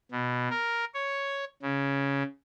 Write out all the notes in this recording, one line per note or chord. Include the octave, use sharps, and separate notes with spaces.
B2
A#4
C#5
C#3